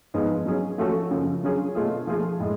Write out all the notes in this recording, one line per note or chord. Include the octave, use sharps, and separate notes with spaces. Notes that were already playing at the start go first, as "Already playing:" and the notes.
G#2 F3 B3 F4 G#4
F#3 C#4 G#4
F3 A3 C#4 F#4 A4
F#2 C#3 F3
D3 F#3 C#4 F4 G#4
B2 A3 F4 G#4
F3 A3 F4 G#4
A2 G#3